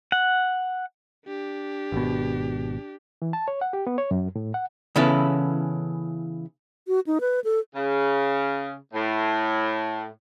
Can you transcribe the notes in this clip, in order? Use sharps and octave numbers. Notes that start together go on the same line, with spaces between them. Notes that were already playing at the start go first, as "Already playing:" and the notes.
F#5
D4 G4
G#1 B2
E3
A5
C#5
F#5
G4
B3
C#5
F#2
A2
F#5
C#3 E3 B3 C#4 E4 A4
F#4
D#4
B4
A4
C#3
A2